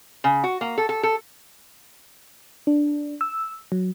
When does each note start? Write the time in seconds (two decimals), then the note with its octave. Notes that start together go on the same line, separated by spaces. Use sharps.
0.24 C#3
0.44 F#4
0.61 A#3
0.78 A4
0.89 A4
1.03 A4
2.67 D4
3.21 E6
3.72 F#3